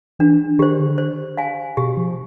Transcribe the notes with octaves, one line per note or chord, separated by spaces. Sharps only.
E3 D4
D#3 G4 C5
D3
C5
F5 G#5
B2 G4
F3